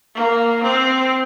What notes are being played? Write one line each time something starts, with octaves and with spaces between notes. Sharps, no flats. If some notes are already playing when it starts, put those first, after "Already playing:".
A#3
C4